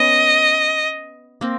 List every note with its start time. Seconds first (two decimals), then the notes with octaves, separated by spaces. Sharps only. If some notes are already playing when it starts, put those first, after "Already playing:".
Already playing: B3 C#4 D#5
1.41 A#3 C4